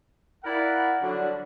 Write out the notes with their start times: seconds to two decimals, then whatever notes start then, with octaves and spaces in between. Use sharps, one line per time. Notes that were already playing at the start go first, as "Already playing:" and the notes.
0.44 E4 A#4 D5 F5 F#5
1.02 D3 F#3 G3 D4 F#4